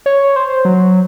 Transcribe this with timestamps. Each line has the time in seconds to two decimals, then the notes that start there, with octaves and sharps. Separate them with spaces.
0.06 C#5
0.36 C5
0.65 F#3